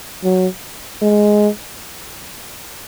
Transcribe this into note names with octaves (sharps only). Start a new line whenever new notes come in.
F#3
G#3